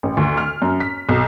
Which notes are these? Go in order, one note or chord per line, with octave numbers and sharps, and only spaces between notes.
A1
D2
F6
F#2
B6
B1